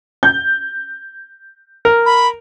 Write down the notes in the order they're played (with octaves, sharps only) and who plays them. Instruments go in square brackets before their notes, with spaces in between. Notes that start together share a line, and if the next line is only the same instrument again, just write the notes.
[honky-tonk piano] G6
[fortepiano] A#4
[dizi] B5